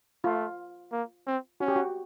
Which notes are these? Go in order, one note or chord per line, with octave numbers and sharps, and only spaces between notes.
A3 F4
A#3
C4
C#4 F#4
G4
F#4